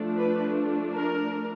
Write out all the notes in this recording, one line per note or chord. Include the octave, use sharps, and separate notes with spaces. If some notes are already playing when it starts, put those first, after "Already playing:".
Already playing: F3 A3 D4
B4
A#4